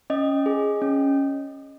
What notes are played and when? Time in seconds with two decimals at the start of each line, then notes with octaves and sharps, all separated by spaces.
0.10 C#4 D#5
0.46 G#4
0.82 C#4